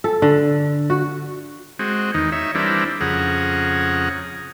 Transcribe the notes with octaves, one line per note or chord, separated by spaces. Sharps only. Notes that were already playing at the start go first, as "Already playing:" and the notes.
A4
D3
F#4
G#3 C4 F#4
E2 D#3 D#4
D#4 C#5 E5
E3 G3 C4 D4 E4 A#4
F2 C#3 G#4 F#5 A#5